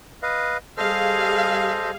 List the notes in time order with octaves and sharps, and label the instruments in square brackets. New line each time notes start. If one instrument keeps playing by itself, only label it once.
[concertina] B4 D#5 F5
[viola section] G3 G#4 F5 [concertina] A4 C5 D#5